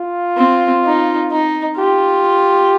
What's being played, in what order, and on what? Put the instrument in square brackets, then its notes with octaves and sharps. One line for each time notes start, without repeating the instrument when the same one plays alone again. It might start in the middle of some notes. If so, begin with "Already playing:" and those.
Already playing: [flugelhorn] F4
[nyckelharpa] C4
D#4
D#4
[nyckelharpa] F4 [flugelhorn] G4